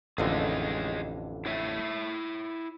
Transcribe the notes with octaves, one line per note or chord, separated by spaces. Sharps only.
A1 F2 D3 G#4 C#5 D#5
E4 C#5 E5